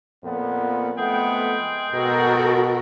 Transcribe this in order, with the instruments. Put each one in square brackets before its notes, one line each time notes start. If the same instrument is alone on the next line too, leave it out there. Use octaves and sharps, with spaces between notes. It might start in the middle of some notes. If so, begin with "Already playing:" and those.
[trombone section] F2 A#2 B3
[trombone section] F2 A3 B3 [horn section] G#3 G#4 G5
[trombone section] B2 [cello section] F#4 A4 A#4